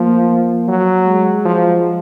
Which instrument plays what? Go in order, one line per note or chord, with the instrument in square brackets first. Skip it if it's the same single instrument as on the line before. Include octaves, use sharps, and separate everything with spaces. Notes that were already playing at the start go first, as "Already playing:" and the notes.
Already playing: [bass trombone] F3 [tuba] A#3
[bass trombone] F#3
[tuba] G#3
[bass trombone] F3